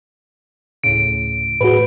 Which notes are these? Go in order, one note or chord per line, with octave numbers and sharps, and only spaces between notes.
D2 A2 C#3 D7
A2 F#4 G#4 B4